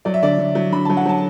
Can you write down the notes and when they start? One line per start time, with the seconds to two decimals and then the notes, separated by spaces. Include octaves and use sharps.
0.05 F#3 D5
0.14 E5
0.23 D3 D5
0.38 D3
0.55 F#3
0.72 D3 B5
0.85 F#3 A5
0.97 F#5
1.06 F#3 A5